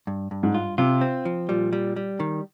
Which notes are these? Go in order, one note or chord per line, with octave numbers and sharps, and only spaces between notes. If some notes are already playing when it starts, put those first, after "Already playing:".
G2
G2
G#2
F4
C3 F4
C4
F3
A#2 G3
G3
G3
D#3